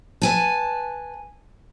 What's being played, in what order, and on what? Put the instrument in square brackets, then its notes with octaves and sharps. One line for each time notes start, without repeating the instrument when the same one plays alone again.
[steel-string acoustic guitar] B4 G#5 A5